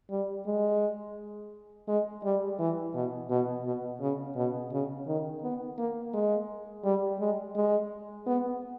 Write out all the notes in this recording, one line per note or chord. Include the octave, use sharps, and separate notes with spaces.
G3
G#3
G#3
G3
E3
B2
B2
B2
C#3
B2
C#3
D#3
B3
A#3
G#3
G3
G#3
G#3
B3